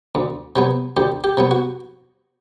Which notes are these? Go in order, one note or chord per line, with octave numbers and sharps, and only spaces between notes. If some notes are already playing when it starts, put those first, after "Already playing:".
D2
C3 F#3 B3
D2 G4
G4
C3 F#3 B3
F#4